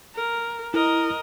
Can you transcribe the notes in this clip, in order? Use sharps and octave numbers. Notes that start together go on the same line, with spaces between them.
A#4
E4 A#4 D#5